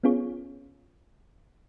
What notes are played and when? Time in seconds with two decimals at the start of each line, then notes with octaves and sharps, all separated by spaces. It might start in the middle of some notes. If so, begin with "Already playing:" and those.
0.03 B3 C#4 F4 G#4 C#5